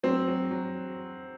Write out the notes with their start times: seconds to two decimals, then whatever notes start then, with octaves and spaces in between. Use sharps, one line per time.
0.03 F#3 C4
0.28 F#3
0.51 F#3